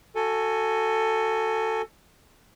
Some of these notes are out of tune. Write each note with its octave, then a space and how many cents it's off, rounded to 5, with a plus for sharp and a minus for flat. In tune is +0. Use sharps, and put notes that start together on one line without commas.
F#4 +0 A4 +15 G#5 +0